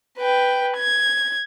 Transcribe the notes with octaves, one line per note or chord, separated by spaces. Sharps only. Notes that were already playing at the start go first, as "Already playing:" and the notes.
B4 G5
G#6